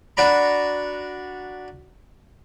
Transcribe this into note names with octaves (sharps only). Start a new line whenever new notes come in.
D4 F#4 D5 A#5 B5